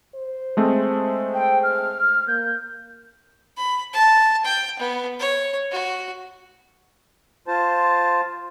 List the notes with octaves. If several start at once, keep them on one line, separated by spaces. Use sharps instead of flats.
C5
G#3 A3 C4
G5
F6
A#3 G6
B5
A5
G5
B3
C#5
F#4
F4 C5 A5